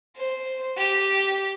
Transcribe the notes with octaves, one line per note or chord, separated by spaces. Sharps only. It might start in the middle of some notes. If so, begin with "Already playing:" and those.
C5
G4